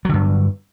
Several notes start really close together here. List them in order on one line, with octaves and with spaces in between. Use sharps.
F#3 D3 G2